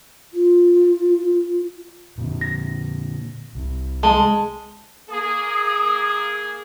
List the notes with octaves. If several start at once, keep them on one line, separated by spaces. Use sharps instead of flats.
F4
A#2 D3
A#6
C2
G#3 A5
A#3 G#4 D#6